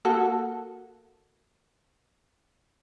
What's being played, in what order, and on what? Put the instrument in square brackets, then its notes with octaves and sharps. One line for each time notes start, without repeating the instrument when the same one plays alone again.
[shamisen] A#3 F#4 A4